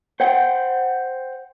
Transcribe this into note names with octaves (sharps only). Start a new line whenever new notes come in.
C5 F#5 G5